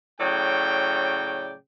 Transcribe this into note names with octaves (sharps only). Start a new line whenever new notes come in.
A2 C#3 F#3 D5 G5